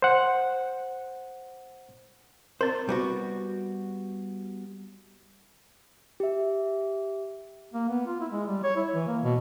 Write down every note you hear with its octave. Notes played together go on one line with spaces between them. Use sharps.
C5 F#5
C4 A#4 C5
G3 B3 F#4
G4 E5
A#3
B3
F4
E4
G#3
G3
C#5
E4
E3
A#3
B2